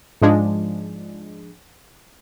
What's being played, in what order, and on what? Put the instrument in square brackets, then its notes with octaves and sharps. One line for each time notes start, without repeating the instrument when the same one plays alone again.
[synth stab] G#2 F3 G#3 D4